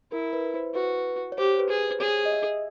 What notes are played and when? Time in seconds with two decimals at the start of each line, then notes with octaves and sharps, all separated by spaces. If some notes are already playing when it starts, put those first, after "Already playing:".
0.12 E4 A#4
0.33 B4
0.54 C5
0.75 F#4 B4
1.32 C#5
1.38 G4 C5
1.59 B4
1.69 G#4
1.90 C5
2.00 G#4 C#5
2.25 D#5
2.32 E5